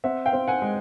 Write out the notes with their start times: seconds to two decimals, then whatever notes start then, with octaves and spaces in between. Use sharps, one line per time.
0.04 C4 E5 F#5
0.26 F5 G5
0.33 C4
0.48 F#5 G#5
0.62 G#3